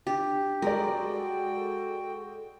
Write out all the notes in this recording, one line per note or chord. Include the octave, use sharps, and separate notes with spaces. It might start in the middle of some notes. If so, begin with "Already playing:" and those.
D4 G4
G#3 F#4 A4 A#4 D5 G5